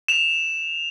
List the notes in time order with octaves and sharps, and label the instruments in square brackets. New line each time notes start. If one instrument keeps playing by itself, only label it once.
[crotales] E7 F7